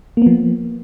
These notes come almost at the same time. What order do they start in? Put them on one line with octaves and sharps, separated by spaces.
A#3 B3 F3